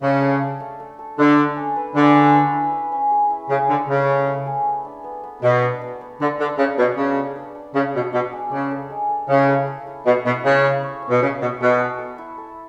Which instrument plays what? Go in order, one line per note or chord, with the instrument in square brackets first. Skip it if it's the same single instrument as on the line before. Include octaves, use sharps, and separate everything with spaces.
[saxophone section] C#3 [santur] D4
[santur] A4
A4
A3
A3
A4
[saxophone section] D3 [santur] A3
[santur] A3
C#4
B4
[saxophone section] D3 [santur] G#4
[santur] C#4
B4
E4
B4
C#4
G#4
E4
[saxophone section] C#3 [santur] G#4
[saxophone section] D3 [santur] E4
[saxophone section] C#3 [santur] A3
[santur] A3
A3
G#4
B3
D4
B3
B3
[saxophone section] B2 [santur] B3
[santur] D4
B3
B3
[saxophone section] D3 [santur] D4
[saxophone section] D3 [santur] D4
[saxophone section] C#3 [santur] D4
[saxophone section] B2 [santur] D4
[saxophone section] C#3 [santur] D4
[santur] A4
D4
D4
[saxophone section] C#3 [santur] D5
[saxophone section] B2 [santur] D5
[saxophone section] B2 [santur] D5
[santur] G#3
[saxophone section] C#3 [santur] D5
[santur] A4
G#3
A4
[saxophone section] C#3 [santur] E4
[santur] A4
A4
E4
[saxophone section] B2 [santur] A4
[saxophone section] B2 [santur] E4
[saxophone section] C#3 [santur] E4
[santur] E4
C#5
C#5
[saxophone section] B2
[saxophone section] C#3 [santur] E5
[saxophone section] B2 [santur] E5
[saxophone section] B2 [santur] A4
[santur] A4
A4
E4
A4